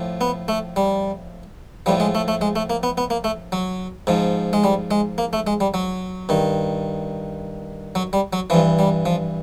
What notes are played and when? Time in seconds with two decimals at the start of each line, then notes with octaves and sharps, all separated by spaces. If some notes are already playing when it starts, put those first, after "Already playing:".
Already playing: A2 F3
0.21 B3
0.48 A3
0.76 G3
1.86 A2 F3 G3
2.00 G#3
2.15 A3
2.28 A3
2.41 G#3
2.56 A3
2.70 A#3
2.83 B3
2.98 B3
3.10 A#3
3.24 A3
3.52 F#3
4.07 G#2 F3
4.53 G#3
4.64 G3
4.91 G#3
5.18 A#3
5.33 A3
5.47 G#3
5.60 G3
5.74 F#3
6.29 G2 D#3
7.95 F#3
8.13 G3
8.33 F#3
8.50 E3 F3
8.54 G2
8.79 G3
9.06 F3